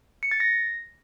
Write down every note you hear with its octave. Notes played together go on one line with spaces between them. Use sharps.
C#7
A6
A#6